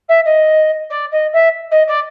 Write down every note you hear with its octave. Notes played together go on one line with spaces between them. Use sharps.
E5
D#5
D5
D#5
E5
D#5
D5